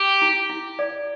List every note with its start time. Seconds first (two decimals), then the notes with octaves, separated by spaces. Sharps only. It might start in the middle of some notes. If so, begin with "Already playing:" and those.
Already playing: G4
0.22 E4
0.50 E4
0.79 D5